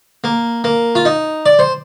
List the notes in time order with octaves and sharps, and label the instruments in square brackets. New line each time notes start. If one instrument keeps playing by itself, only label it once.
[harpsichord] A#3
A#3
F4
D#4
D5
C5